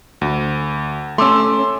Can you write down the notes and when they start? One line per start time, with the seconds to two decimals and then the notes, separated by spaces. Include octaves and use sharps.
0.21 D2
1.18 A3 C#4 C6 D6 E6